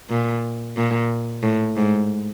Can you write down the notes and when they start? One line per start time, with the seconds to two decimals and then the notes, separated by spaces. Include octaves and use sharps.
0.10 A#2
0.76 A#2
1.43 A2
1.76 G#2